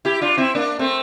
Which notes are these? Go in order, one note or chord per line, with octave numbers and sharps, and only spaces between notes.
E4 G4
D4 F4
C4 E4
A#3 D4
A3 C4